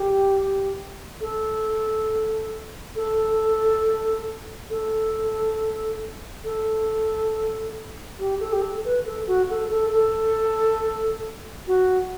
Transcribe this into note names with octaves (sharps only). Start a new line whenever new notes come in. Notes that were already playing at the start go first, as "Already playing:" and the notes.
Already playing: G4
A4
A4
A4
A4
G4
A4
G4
A4
B4
A4
F#4
A4
A4
A4
F#4